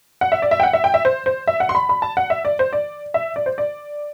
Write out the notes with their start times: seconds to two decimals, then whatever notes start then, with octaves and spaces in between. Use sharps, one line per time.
0.21 F#5
0.32 E5
0.42 D5
0.51 E5
0.60 G5
0.63 F#5
0.73 E5
0.84 G5
0.94 E5
1.05 C5
1.26 C5
1.47 E5
1.60 F#5
1.69 C6
1.75 B5
1.89 B5
2.02 A5
2.17 F#5
2.30 E5
2.45 D5
2.59 C5
2.73 D5
3.14 E5
3.36 D5
3.46 C5
3.58 D5